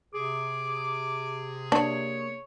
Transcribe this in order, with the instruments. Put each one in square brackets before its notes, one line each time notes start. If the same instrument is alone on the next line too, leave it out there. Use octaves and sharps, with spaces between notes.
[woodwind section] C3 G#4 [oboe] D6
[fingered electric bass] A#3 [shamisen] D4 [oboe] C#5